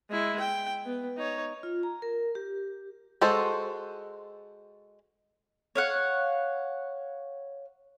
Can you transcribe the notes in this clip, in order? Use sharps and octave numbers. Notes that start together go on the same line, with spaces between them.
G#3 E4
G5
B3
D#4 C#5
F4
A#5
A#4
G4
G#3 F#4 A4 C5
C#5 F5 F#5